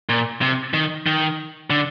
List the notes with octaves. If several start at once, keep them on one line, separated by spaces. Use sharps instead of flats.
A#2
C3
D#3
D#3
D3